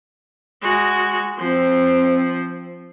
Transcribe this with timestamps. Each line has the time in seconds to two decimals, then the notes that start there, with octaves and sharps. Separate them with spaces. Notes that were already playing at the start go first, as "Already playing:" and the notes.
0.62 G#3 F#4
1.39 F3 C4